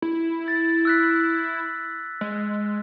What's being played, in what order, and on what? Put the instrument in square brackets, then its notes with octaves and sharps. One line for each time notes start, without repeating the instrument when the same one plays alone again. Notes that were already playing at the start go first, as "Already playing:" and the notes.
[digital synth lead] E4
[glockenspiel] A6
E6 F#6 B6
[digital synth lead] G#3